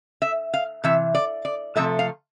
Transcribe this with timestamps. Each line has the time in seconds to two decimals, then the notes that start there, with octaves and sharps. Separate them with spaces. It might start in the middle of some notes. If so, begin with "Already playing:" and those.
0.22 E5
0.54 F5
0.84 C3 E3 E5
1.15 D5
1.45 D5
1.76 C3 F3 A3 E5
1.99 F5